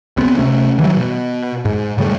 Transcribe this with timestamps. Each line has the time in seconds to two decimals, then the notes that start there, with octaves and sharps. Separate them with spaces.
0.17 C#2 B3 C4
0.37 C3 A3 C#4
0.79 D#3 E3 F#3 G3
0.97 B2
1.65 G#2
1.97 G#2 C#3 G3 A3